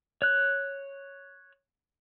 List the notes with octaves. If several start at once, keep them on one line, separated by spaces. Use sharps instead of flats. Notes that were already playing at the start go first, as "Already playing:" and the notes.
C#5 F#6